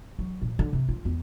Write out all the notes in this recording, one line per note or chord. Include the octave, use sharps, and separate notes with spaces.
F#3
A#2
D3
C3
F4
E2